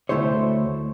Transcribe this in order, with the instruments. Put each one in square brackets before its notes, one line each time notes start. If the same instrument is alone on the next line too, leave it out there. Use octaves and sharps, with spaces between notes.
[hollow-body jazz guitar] D2 G2 A3 E4 C5 C#5